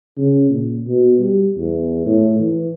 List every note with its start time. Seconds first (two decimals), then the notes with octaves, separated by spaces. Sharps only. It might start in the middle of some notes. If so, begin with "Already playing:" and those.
0.18 C#3
0.50 A#2
0.88 B2
1.20 G3
1.57 E2
2.06 A2
2.40 E3